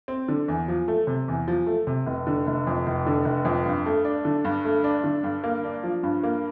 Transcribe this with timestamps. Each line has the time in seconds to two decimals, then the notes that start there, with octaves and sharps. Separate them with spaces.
0.08 C4
0.28 D3
0.48 E2
0.68 F3
0.88 A3
1.07 C3
1.28 E2
1.48 F3
1.67 A3
1.87 C3
2.07 F1
2.27 D3
2.47 F1
2.67 F2
2.87 F1
3.06 D3
3.25 F1
3.45 F2
3.66 G2
3.86 A3
4.05 D4
4.25 D3
4.45 G2
4.65 A3
4.84 D4
5.04 D3
5.24 G2
5.44 A#3
5.64 D4
5.84 F3
6.03 G2
6.23 A#3